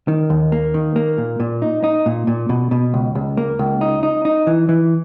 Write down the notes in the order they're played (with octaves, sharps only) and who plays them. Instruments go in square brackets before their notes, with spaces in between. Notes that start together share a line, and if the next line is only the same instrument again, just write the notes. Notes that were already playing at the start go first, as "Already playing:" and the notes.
[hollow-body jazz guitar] D#3
D#2
A#3
D#3
A#3
A#2
A#2
D#4
D#4
A#2
A#2
B2
B2
C#2
C#2
A#3
C#2
D#4
D#4
D#4
E3
E3